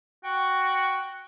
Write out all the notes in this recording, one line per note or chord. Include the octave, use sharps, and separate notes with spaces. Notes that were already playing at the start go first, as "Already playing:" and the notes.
F#4 G5